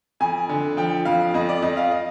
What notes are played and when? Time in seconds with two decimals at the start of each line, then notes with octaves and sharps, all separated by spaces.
0.20 F2 G#5
0.49 D3
0.77 F3 G5
1.05 F2 F5
1.34 F2 D#5
1.49 D5
1.62 F2 D#5
1.77 F5
1.91 D#5